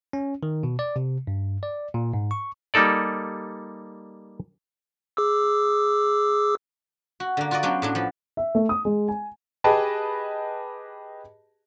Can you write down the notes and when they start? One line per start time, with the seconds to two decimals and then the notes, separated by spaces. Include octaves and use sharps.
0.13 C#4
0.43 D#3
0.63 B2
0.79 D5
0.96 C3
1.27 G2
1.63 D5
1.94 A#2
2.14 G#2
2.31 C#6
2.74 G3 A#3 D#4 A4 D5
5.17 G#4 D6 E6
7.20 F#4
7.37 D3 A#3
7.51 F4 F#4 A#4 D5 D#5
7.63 F#3 B3 C#4 D4 C5 G5
7.82 A2 F#3 D4
7.95 F3 B3
8.37 E5
8.55 A3
8.69 D#6
8.85 G#3
9.08 G#5
9.64 G4 G#4 B4 D#5 G5 A5